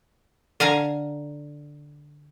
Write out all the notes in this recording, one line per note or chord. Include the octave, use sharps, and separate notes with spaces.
D3 F5 G#5 A#5